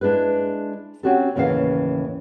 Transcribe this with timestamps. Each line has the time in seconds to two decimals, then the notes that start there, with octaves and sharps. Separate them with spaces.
0.01 G#3 D4 E4 G#4 B4
1.03 C4 C#4 F#4 G4 A4
1.35 D#2 A2 C#3 E3 C#4 F5